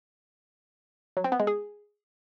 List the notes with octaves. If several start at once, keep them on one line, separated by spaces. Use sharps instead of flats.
F#3
C4
B3
G#3
G#4